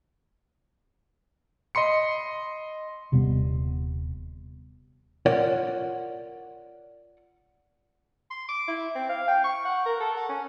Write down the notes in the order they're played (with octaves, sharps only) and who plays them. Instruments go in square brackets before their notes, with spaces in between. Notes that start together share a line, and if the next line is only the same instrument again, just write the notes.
[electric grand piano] D#5 B5 C6 C#7
[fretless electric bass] D#1 C3 G3 B3
[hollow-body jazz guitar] F4 A#4 C#5 D5 F#5
[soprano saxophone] C6
D6
E4
C4
F5
G5
C#6
F#5
A#4
A4
F#5
C#4